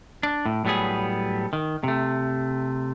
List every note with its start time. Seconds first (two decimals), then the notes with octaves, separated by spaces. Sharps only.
0.23 D4
0.46 A2
0.65 A2 F#3 G3 B3 G#4
1.53 D#3
1.84 C3 A3